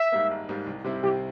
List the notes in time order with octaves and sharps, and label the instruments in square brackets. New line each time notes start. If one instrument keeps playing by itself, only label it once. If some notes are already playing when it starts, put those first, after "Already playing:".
Already playing: [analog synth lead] E5
[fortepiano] G#2 G3 A#3
G#1
G#2 G3 A#3
C2
C3 G3 C4 E4
[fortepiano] C2 [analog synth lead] G4